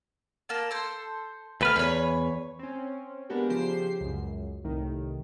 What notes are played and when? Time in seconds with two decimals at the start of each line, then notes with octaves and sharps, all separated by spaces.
0.49 A#3 A5
0.71 A4 C5
1.61 D2 A3 B4 F6
1.76 E2 B4 C#5
2.59 C4 C#4
3.29 G#3 A#3 B3 D4 F#4 G4
3.49 C#3 F3 G4 C5 C7
4.01 C#2 F#2
4.64 C2 A2 D#3